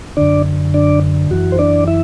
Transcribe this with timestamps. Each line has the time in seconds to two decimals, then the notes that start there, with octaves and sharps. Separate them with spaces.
0.17 F#2 D3 D4 D5
0.74 D4 D5
1.31 F#2 E3 F#4
1.52 C5
1.59 D4 D5
1.88 E4 E5